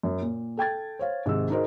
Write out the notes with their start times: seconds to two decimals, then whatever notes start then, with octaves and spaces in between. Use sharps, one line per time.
0.03 F#2
0.22 A#2
0.57 A4 G5 G#6 A6
0.99 C5 C#5 F5
1.26 G#2 C3 D#3 E6
1.50 D#4 F#4 G#4 A#4 C5 D#5